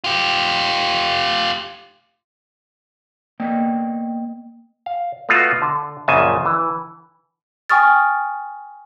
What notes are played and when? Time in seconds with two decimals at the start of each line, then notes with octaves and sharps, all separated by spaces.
0.04 F4 G4
3.40 A#3 B3 D5 D#5 G5
4.86 F5
5.29 A3 B3 F4 F#4 D#5
5.62 D3
6.08 A#1 F#2 A#2 C#3 G#5 A5
6.46 E3
7.70 G5 G#5 C#6 D#6 F6 A6